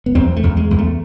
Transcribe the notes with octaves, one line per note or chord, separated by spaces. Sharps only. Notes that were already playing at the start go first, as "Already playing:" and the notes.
B3
E2 C4
A3
E2
G#3
E2
A3